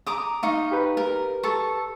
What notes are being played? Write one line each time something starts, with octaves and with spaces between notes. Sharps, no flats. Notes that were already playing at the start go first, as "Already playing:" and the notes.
A#5 D6 D#6
D#4 F5 C#6
G4 B4
A#4
A4 C#6